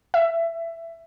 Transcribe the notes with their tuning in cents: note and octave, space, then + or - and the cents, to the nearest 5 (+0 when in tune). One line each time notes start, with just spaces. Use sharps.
E5 +15